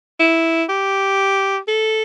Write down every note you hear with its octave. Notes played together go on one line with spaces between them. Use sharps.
E4
G4
A4